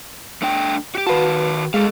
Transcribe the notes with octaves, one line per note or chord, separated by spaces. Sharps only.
A3 D4 G5
F#4 G4
D#3 F#4 B4 F5 A5
G#3 A4 D#5 F5